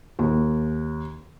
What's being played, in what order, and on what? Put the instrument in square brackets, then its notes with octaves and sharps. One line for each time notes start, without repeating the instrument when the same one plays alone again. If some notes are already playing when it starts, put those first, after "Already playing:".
[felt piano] D#2